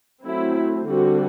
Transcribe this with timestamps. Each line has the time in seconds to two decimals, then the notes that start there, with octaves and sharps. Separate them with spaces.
0.24 F#3 A3 C4 E4
0.88 D3 G3 C4 F#4